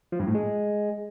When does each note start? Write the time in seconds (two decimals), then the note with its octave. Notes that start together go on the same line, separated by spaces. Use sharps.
0.12 F3
0.20 G2
0.27 A2
0.35 G#3